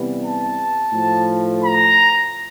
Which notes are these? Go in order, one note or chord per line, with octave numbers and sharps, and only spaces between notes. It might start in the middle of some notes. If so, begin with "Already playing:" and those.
Already playing: C3 E3 G3 B3
A5
A2 F3 A3
A#5